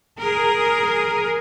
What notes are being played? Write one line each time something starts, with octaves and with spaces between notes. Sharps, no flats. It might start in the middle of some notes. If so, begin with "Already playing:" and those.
G#4 A#4